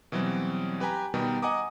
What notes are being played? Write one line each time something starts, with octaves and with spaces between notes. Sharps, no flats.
B2 E3 F#3 G3 C4
G4 B4 G5 G#5 A#5
B2 D#3 G3 B3 G5 A#5
D#5 F#5 G#5 A#5 D6 D#6